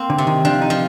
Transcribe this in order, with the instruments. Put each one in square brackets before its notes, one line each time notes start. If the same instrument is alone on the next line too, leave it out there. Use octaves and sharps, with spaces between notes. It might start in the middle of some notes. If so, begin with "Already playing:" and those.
Already playing: [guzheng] A#3 C4
[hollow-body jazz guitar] D3
[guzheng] C3
[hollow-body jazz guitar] D#3
[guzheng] F3 [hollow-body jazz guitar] D4
[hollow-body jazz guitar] D#4
[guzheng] F3